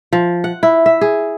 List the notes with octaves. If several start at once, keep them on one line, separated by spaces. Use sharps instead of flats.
F3
F#5
E4
E5
G#4